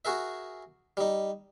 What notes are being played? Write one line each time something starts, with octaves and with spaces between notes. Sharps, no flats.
F#4 G#4 A#4 E5
G3 D#4